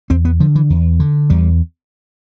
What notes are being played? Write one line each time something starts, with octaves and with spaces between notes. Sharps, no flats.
E2 C4
B3
D3 F3
E3
E2
D3
E2 G3